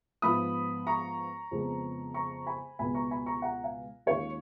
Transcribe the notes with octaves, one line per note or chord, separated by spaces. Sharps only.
G#2 F3 B3 F4 B5 D#6
A#5 C#6
F2 C#3 G#3 B3
A#5 C#6
G#5 B5
C#2 B2 G#3 B3 G#5 B5
A#5 C#6
G#5 B5
A#5 C#6
F#5 A#5
F5 G#5
D#2 D#3 G#3 C#4 F4 C#5 F5